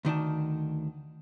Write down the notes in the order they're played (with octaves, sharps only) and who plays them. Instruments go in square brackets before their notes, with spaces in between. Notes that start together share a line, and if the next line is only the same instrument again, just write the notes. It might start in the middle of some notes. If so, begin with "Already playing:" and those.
[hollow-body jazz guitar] D2 D#3 D5 A5